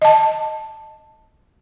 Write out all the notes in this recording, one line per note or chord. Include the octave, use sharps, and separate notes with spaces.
D#5 A5